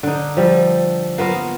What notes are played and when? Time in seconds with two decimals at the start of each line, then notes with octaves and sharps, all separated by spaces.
0.03 D3 D#4
0.37 F3 G3
1.18 A#3 B3 F4 A#4